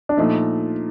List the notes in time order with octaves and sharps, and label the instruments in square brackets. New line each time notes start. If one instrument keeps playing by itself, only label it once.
[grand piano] D4
[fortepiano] A#2 F3 A3 [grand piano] D#4